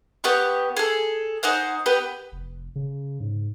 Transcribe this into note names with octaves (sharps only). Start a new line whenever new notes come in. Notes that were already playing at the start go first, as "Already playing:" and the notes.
B3 G4 F#5 C#6
G#4 A4
D#4 C5 F#5 G#5
B3 G4 B4 G5
F1
C#3
G#2